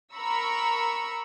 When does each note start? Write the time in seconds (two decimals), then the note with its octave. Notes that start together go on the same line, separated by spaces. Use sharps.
0.15 A#4 A#5 B5 C#6 E6